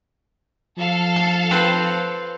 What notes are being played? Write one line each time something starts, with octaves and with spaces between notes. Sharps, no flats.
F3 A4 F5
A5
C4 B4 C5